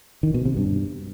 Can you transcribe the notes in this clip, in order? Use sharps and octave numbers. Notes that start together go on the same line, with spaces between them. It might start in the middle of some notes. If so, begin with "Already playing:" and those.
D#3
B2
C3
G2